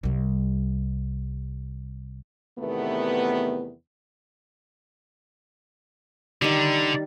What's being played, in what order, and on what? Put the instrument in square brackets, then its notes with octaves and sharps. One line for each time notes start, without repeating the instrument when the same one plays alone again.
[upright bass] C2 G3
[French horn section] E2 C3 D#3 A3 B3
[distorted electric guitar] D3 [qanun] D#3 G3